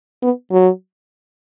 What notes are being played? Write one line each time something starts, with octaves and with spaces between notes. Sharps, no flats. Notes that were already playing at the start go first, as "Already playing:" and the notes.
B3
F#3